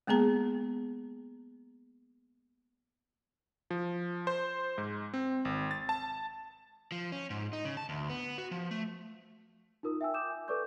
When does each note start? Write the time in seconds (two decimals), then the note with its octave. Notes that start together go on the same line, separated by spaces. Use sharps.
0.07 G#3 A#3 B3 G#4 A#5
3.71 F3
4.27 C5
4.78 G#2
5.14 C4
5.45 G#1
5.71 A6
5.89 A5
6.92 F3
7.12 C#4
7.30 G#2
7.53 D#4
7.65 C#3
7.77 A5
7.89 D2
8.09 B3
8.38 F#4
8.51 F3
8.71 A3
9.83 D#4 F4 A#4 D#6
10.01 E5 G5 G#5 E6
10.14 D6 D#6 G6 E7
10.30 G#5
10.48 A4 B4 D5 C#6 D6 G6